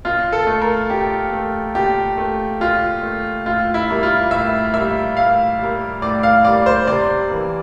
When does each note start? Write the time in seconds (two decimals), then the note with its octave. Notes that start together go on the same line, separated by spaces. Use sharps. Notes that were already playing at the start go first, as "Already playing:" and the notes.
0.05 A#2 F4
0.32 A4
0.47 A3
0.62 A#4
0.90 A#2 G4
1.33 A3
1.75 A#2 G4
2.18 A3
2.61 A#2 F4
3.03 A3
3.46 A2 F4
3.74 E4
3.88 G3 A#3
4.03 F4
4.31 A2 E5
4.74 G3 A#3 E5
5.16 A2 F5
5.59 G3 A#3
6.02 A2 D5
6.23 F5
6.45 G3 A#3 D5
6.66 C5
6.87 C3 D5
7.29 E3 A#3